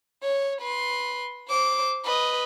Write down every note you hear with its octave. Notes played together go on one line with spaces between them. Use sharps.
C#5
B4 C6
C5 D6
B4 D#5